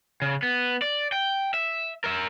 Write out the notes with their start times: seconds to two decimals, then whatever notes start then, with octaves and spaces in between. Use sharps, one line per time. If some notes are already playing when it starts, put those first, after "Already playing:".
0.22 C#3
0.43 B3
0.82 D5
1.12 G5
1.54 E5
2.04 A#4 E5